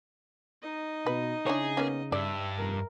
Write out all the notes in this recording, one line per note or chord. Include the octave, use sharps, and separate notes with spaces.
D#4 D#5
B2 B4
C#3 D4 E4 G#4 C#5
A#3 B3 C#4
G2 D5 E5
F1 A#4